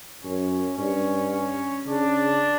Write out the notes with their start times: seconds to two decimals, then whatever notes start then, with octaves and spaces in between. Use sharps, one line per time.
0.24 F#2 C#4
0.78 G2 C#4
1.32 C#4
1.86 C#3 D4